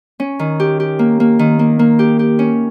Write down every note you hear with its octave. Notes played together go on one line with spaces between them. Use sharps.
C#4
D#3
G4
G4
A#3
A#3
D#3
A#3
A#3
G4
G4
C#4